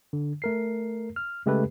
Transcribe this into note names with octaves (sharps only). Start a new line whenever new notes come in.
D3
A3 A#4 C7
F6
C#3 G#3 A3 G4 A4 B4